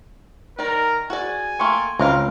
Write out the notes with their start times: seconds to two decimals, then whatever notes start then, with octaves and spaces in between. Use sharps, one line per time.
0.59 D#3 A#4 D5
1.10 F#4 G#4 D5 G#5
1.59 A3 A#3 A4 G5 C6 C#6
1.99 C#2 C4 A#4 F5